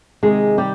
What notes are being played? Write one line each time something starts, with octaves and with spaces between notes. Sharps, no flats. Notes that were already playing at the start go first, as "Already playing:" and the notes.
C3 D#3 G#3 G#4
G3 G4